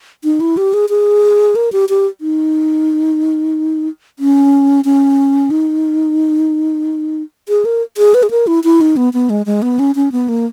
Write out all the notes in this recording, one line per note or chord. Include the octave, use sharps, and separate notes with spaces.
D#4
E4
G4
G#4
G#4
A#4
G4
G4
D#4
C#4
C#4
D#4
G#4
A#4
G#4
B4
G#4
A#4
E4
E4
D#4
B3
B3
G#3
G#3
B3
C#4
C#4
B3
A#3